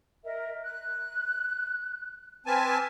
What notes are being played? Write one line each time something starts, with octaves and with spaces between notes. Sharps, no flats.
A#4 D#5 E5
F#6
C4 B4 G#5 A5 D6 F6